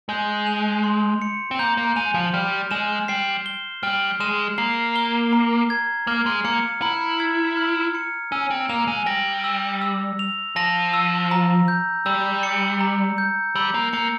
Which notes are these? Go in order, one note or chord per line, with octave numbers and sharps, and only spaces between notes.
G#3 G6
F7
C6
C#7
C4
A#3 G6
A#3
G#3 F7
F3
G3 F6
G#3 E7
G3 C7
G7
G3 F6
G#3 E7
A#3 C7
G7
A#5
G#6
A#3 F6
G#3
A#3 C#7
E4 A#5
G#6
F6
C#7
C#4 E6
C4
A#3 F7
G#3
G3 A#6
E6
E6
F7
F3 A#6
E6
A#5
G6
G3 E6
C#7
A#5
G6
G3 E6
A#3
A#3 C#7